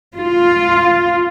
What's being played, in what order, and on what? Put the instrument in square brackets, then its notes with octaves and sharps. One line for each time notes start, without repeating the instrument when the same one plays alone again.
[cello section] F4